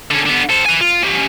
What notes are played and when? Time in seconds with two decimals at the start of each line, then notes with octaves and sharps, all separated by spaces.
0.11 D3 C#4
0.26 D3 B3
0.50 A4 C5
0.66 B4 G#5
0.81 F4
1.03 C#4 G4